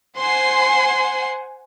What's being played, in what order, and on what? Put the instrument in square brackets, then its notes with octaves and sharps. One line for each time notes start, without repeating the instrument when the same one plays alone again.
[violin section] C5 F#5 G#5 [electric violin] C6 C7